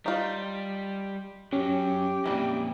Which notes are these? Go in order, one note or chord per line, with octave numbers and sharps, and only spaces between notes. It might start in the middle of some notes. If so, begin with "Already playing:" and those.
G3 D#4 F4
F#2 F#3 C#4 G4
F2 A#2 E3 G3